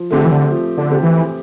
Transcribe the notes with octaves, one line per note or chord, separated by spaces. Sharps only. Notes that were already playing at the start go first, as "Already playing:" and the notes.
Already playing: F3
D3 A3 C4 G4
E3
D3
F3
D3
A3 C4 G4
E3